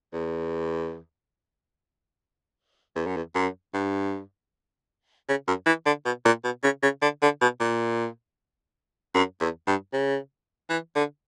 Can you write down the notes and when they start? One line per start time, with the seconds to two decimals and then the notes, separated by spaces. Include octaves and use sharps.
0.13 E2
2.96 E2
3.07 F#2
3.16 E2
3.35 F#2
3.74 G2
5.28 C#3
5.47 F#2
5.66 E3
5.86 D3
6.05 B2
6.25 A#2
6.44 B2
6.63 C#3
6.82 C#3
7.02 D3
7.22 D3
7.41 B2
7.60 A#2
9.14 F#2
9.40 E2
9.67 G2
9.93 C#3
10.70 E3
10.95 D3